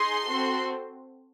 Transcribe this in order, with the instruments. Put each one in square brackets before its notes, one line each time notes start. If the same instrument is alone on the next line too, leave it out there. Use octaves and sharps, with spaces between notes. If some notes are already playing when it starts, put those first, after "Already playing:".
Already playing: [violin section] D#4 G#4 C6
C4 F#4 A4